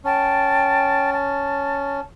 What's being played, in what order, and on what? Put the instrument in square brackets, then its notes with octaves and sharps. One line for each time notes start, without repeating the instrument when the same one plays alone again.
[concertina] C#4 [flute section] G5 A5
[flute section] A5